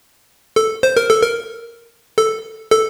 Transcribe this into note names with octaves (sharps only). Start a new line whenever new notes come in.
A4
C5
A#4
A4
A#4
A4
A4